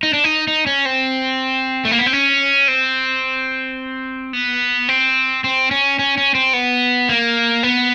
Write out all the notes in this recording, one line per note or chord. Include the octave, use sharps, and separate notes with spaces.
D#4
D4
D#4
D#4
C#4
C4
A3
A#3
B3
C4
C#4
C4
B3
C4
C4
C#4
C#4
C#4
C4
B3
A#3
B3